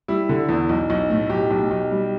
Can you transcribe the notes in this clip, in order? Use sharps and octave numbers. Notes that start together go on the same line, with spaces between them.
G3 E4
D3
E2
B1
B1
A2
B1 G4
B1
B1
G3